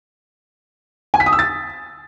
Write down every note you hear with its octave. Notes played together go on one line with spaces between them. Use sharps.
G#5
B6
D#6
E6
A6